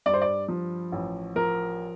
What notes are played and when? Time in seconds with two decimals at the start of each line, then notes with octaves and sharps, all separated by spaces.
0.06 G2 D5
0.14 C5
0.22 D5
0.48 F3
0.92 A1
1.36 F3 A#4